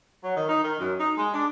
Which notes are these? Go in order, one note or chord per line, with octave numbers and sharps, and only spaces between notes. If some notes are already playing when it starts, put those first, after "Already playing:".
F#3
D#3
D#4
D#3
F#2
D#4
G#3
D4